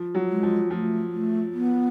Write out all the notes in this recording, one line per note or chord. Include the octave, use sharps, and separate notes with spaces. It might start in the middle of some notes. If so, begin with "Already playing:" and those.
Already playing: F3
F#3
G#3
F3
F3 A3
A3
B3